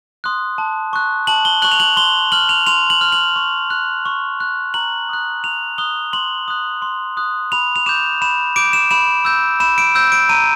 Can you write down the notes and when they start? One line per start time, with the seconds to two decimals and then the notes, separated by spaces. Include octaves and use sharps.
0.24 C6 D#6 F#6
0.58 A5
0.93 C#6 F#6
1.27 A5 F#7
1.45 G7
1.62 C#6 F#6 F#7
1.72 F7
1.80 F#7
1.97 C6 G7
2.32 F6 F#7
2.49 F7
2.67 C6 F7
2.90 F#7
3.01 F6
3.12 F#7
3.36 C#6
3.70 F#6
4.06 C#6
4.40 F#6
4.74 A#5 F#7
5.09 D#6 F#6
5.44 A#5 F7
5.78 D#6 F#6 G7
6.13 C6 F#7
6.48 D#6 F#6
6.82 C6
7.17 D#6 F#6
7.52 B5 F7
7.76 F7
7.86 D6 G6 E7
8.22 B5 E7
8.56 D6 G6 D7
8.73 E7
8.91 B5 E7
9.25 E6 G6
9.60 B5 E7
9.78 D7
9.95 E6 G6
10.12 D7
10.29 A#5 D#7